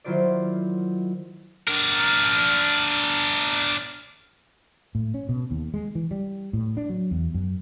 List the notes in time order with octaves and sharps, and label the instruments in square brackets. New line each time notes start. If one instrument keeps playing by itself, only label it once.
[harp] D#3 F#3 E4 F4 C5 D5
[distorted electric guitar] D4 A#4
[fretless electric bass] A2
C#4
B2
D#2
G#3
E3
G3
A2
D4
F#3
E2
F#2